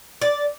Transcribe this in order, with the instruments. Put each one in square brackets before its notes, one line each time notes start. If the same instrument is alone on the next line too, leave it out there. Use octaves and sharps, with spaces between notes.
[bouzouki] D5